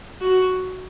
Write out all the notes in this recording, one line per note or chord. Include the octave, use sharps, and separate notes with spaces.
F#4